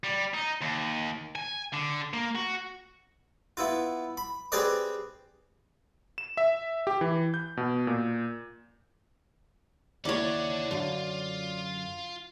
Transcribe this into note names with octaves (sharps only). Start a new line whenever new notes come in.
G3
D#4
D#2
G#5
D3
A#3
F#4
B3 E4 F4
B5
C4 G4 G#4 B4 D5 D#5
E7
E5
G4
E3
G6
B2
A#2
D#2 E4 A4 C#5 D5 F#5
F#2 D3 F4